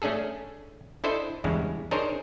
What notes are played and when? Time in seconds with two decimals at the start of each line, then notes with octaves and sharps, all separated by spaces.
0.02 A3 C#4 D4 G#4 A4
1.04 D4 E4 A4 C5 D#5
1.44 E2 G2 C#3 G#3
1.91 D4 D#4 G#4 A#4 C5 C#5